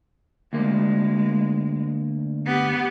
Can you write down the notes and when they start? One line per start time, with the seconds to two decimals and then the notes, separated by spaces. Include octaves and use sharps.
0.53 D2 G#3 A#3
2.46 B3 G4